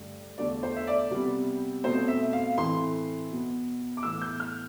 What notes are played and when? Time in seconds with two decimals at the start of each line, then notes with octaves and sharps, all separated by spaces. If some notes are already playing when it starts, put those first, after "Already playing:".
Already playing: G2 D3 A3
0.38 E2 D3 A3 D5
0.63 C5
0.76 E5
0.87 D5
1.11 C3 G3 B3
1.84 B2 A3 C4 C5
2.08 E5
2.33 F5
2.58 A2 E3 A3 C4 C6
3.30 B2 B3
3.97 D6
4.03 A2 E3 B3 E6
4.22 G6
4.40 F6